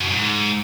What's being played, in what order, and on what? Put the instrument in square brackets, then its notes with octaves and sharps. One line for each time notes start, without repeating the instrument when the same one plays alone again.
[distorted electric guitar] F#2
A2
G#2